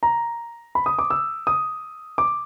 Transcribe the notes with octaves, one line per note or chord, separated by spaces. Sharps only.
A#5
B5
D#6
D6
E6
D#6
D6